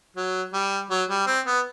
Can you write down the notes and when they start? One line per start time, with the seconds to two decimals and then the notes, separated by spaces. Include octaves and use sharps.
0.16 F#3
0.53 G3
0.90 F#3
1.09 G3
1.26 C4
1.46 B3